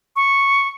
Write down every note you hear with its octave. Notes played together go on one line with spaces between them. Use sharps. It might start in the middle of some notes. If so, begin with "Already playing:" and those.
C#6